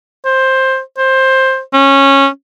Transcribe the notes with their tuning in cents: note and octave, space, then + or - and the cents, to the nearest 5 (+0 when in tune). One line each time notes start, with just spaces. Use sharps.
C5 +10
C5 +15
C#4 -15